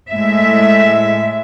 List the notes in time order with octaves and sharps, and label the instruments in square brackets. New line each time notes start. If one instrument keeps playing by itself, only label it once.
[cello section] A2 G#3 E5